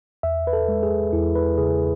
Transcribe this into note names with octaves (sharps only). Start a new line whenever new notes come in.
E2 E5
B4
A4
G#3
G#4
E2 E4
B4
C#3 G#4